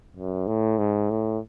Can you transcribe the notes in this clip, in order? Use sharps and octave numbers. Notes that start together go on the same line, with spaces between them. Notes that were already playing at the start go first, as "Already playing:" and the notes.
F#2
A2
G#2
A2